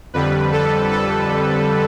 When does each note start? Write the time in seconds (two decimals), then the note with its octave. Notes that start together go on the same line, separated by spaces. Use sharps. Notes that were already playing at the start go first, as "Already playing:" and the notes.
0.14 F2 D3 G3 B4
0.52 A4
0.91 A4